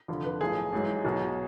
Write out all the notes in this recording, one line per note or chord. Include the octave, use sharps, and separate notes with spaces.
F1 F2 D3 F3
B4
B1 A2 F3 G#4
A1 G#2 F#3
B1 B2 F#3